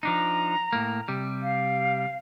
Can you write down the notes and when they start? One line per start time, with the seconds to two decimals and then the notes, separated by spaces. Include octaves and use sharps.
0.03 F3 D4 D#4 A#5
0.73 A2 A#3
1.08 C3 G3
1.42 F5